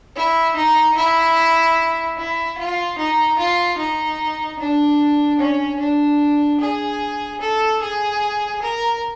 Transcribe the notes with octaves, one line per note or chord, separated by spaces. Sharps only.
E4
D#4
E4
E4
F4
D#4
F4
D#4
D4
C#4
D4
G#4
A4
G#4
A#4